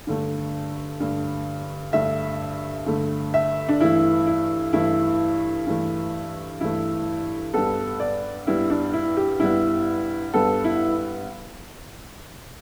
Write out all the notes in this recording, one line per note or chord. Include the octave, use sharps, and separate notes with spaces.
G2 D3 A3
G2 D3 A3
G2 D3 A3 E5
G2 D3 A3
E5
D4
G2 E3 A3 E4
E4
G2 E3 A3 E4
G2 E3 A3
G2 E3 A3 E4
G2 G3 B3 A4
D5
G2 G3 B3 E4
D4
E4
G4
G2 G3 B3 E4
G2 G3 B3 A4
E4